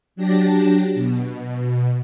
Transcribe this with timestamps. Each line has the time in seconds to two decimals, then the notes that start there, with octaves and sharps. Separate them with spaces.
0.16 F#3 D4 G4 A5 A#6
0.95 B2